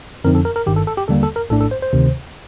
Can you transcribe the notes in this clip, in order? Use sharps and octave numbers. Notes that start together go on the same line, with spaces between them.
F2 D3 F3 C4 D#4 A#4
A4
A#4
A#4
G1 G2 D#3 G4
A4
A4
G4
D#2 D3 G3 A#3 A4
A4
A#4
A#1 A2 A3 D4 A4
A4
C5
C5
D2 C3 D#3